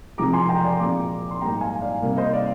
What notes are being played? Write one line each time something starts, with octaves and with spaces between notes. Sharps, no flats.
C3 F3 G#3 C4 A#5 D6
G#5 C6
G5 A#5
D5 F5
A#2 G#3 C4 A#5 D6
C6
G#2 G3 A#3 G5 A#5
F5 G#5
D5 F5
C3 G3 A#3
C5 D#5
D5 F5